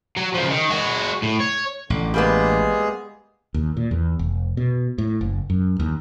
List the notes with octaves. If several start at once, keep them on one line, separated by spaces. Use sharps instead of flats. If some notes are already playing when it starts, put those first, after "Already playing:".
F#3
C#3 F3
D#3
G#3 F#4
A2
C#5
A1 D3
G3 G#3 A#3 B3 G#4
D#2
A#2
E2
F1
B2
A2
F#1
F#2
D#2